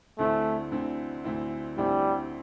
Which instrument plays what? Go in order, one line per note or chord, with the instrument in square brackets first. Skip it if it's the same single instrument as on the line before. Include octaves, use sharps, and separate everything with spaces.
[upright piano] D2 D3 C4 E4 [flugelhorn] A3
[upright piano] D2 D3 C4 E4
D2 D3 C4 E4
[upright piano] D2 D3 C4 E4 [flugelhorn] G3